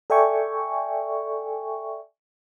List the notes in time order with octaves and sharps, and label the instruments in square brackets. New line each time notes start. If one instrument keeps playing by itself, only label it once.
[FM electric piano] A4 D5 E5 G5 G#5 C#6